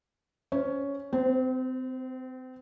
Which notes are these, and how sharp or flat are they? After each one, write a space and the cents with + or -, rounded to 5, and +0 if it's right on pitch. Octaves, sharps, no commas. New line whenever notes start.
C#4 +10 C5 +0
C4 -30 C5 +0